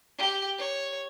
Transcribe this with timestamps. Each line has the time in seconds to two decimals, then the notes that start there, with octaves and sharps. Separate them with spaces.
0.18 G4
0.58 C#5